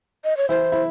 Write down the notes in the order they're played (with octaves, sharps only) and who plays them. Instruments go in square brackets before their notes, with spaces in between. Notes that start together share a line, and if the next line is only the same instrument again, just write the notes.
[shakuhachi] D#5
C#5
[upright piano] E3 E4 [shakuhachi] C5
[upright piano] E4